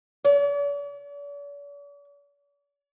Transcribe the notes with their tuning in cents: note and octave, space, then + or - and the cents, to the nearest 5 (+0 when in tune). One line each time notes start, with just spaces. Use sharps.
D5 -45